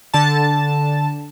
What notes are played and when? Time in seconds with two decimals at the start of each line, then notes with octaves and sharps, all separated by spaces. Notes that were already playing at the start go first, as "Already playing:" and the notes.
0.14 D3 A5